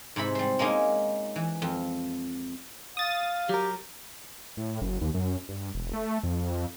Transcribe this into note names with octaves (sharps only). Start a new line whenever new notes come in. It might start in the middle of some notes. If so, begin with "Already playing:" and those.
G#2 C3 E4 B5
G3 C5
G#3 A#3 C#4 D#4 G#4
E3
F2
F5 D#6 A6
F#3 G4 A#4
A2
F#1
D#2
F#2
G2
E1
A3
F2